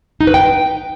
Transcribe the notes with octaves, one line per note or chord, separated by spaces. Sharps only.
D#4
B4
G5